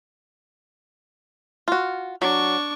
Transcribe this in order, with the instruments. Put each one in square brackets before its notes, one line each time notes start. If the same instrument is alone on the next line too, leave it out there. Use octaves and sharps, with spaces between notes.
[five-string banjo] F4 F#4
[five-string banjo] F#3 [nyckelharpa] D4 C#6